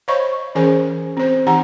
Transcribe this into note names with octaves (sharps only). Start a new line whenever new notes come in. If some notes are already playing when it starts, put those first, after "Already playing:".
C5 C#5 D#5 F5 B5 C#6
E3 C#4 G#4 A#4 C5 G#5
C4 C5
E3 D#4 G4 F#5 G#5 A#5